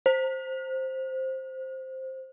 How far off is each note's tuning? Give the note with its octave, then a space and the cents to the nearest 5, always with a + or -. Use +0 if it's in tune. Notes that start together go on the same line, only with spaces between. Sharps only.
C5 +5